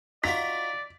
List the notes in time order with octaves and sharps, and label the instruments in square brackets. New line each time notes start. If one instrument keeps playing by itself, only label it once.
[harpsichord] D#4 F4 F#4 [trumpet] D5 [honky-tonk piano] B6